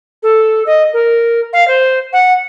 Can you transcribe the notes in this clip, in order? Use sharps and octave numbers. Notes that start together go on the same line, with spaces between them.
A4
D#5
A#4
F5
C5
F#5